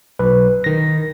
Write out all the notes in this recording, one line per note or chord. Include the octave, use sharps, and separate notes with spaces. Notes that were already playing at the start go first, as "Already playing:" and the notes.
B1 B4
D#3 A#6